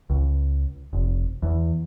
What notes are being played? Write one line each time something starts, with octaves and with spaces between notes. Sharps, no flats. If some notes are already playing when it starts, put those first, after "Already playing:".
C#2
F1
E2